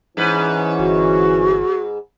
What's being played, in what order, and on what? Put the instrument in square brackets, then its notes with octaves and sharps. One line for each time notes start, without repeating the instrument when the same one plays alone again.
[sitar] G#2 B4 [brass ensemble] E3 C#4
[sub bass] G1 [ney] F#4